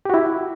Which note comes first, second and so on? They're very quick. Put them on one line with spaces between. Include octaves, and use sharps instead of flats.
G4 F#4 E4